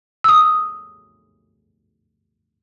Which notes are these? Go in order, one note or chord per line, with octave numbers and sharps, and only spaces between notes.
D#6 E6